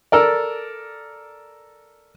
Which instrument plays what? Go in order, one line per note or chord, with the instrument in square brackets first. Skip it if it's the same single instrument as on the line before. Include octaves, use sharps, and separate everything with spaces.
[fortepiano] A4 A#4 D5